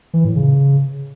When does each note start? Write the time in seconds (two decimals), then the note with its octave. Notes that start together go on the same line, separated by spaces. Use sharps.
0.14 E3
0.25 A2
0.36 C#3